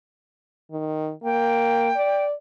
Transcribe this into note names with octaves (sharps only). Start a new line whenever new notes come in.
D#3
A#3 G5
D5